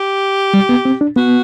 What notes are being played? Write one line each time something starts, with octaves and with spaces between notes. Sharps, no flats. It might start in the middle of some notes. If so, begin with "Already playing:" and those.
Already playing: G4
G3
B3
C4
D4
B3 F#4